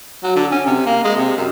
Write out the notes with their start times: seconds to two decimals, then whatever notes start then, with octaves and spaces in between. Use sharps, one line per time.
0.23 F#3
0.35 D3
0.51 C#4
0.66 C3
0.86 A#3
1.04 G#3
1.17 C3
1.37 F#2